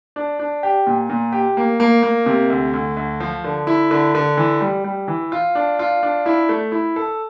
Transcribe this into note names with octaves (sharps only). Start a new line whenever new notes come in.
D4
D4
G4
A#2
A#2
G4
A#3
A#3
A#3
C3
D2
D2
D2
F3
D3
E4
D3
D3
E3
G3
G3
E3
F4
D4
F4
D4
E4
A3
E4
A4